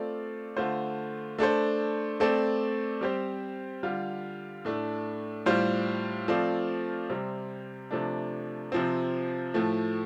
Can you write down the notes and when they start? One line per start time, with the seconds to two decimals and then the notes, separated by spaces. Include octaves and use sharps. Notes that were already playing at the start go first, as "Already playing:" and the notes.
Already playing: A3 C4 F4 A4 D5
0.57 D3 A3 F4 C5
1.39 A3 D4 A4 C5
2.20 A3 C4 A4 D5
3.01 G3 C4 G4 C5
3.83 D3 G3 F4
4.65 A2 A3 D4
5.46 A2 G3 F4 C5
6.28 F3 A3 C4 F4 D5
7.10 C3 G3 C4
7.91 C3 F3 A3 D4
8.72 C3 F3 C4
9.54 A2 F3 A3